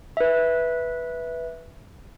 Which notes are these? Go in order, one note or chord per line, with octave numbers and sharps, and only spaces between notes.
B4 E5